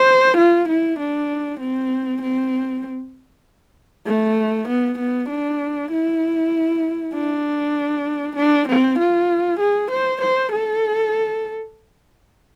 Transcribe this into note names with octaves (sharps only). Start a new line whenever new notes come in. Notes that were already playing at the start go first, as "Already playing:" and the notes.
Already playing: C5
F4
E4
D4
C4
C4
A3
B3
B3
D4
E4
D4
D4
C4
F4
G#4
C5
C5
A4